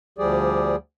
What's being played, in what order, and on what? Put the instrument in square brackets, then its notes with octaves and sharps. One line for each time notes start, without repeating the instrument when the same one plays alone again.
[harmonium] D2 F3 G3 G4 G#4 D5